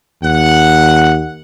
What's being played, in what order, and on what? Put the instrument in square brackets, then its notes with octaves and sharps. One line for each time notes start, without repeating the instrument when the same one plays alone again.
[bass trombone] D#2 [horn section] F#5